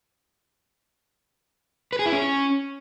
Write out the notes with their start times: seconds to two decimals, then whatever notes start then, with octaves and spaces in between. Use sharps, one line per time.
1.93 B4
1.99 G#4
2.06 E4
2.12 C#4